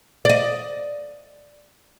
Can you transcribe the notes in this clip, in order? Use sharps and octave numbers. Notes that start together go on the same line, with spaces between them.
D5 D#5